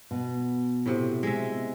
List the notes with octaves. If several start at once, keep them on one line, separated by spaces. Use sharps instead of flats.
B2
A2 C3
G#3 E5